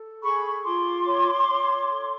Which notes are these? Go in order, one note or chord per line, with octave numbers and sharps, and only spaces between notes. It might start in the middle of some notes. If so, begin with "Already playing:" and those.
Already playing: A4
G#4 B5 C#6
F4 C6 D6
C#5
C#5
A4